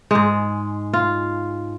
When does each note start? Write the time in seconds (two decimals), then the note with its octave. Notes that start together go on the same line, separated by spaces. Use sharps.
0.11 G#2 G#3
0.93 F4